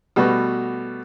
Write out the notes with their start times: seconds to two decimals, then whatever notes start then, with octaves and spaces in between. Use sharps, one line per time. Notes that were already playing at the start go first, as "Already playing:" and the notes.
0.16 B2 G3 A3 F#4 B4